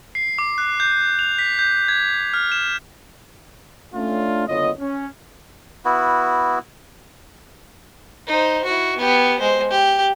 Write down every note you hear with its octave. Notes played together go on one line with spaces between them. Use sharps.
C7
D6
F#6
G6
F7
B6
G6
G#6
F6
E7
A3 C#4 D4 F4
F#1 D3 B3 F4 C#5 D#5
C#4
B3 E4 F#4
D#4 C5
E4 F#4
B3 G4
G#3 C5
G4